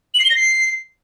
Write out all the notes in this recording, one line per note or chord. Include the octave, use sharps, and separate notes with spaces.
F#7
C7
G7
A#6
C7